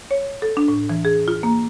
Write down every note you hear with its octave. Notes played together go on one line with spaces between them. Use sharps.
C#5
A4
D4
A2
E3
G#4
F4
A#3